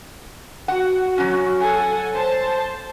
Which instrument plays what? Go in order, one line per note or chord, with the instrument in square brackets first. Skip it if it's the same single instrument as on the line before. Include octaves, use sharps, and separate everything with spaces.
[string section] F#4 [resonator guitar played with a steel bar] F#5
[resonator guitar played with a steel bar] F#3 C#4
[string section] A4 F#5 G#5
C5 A5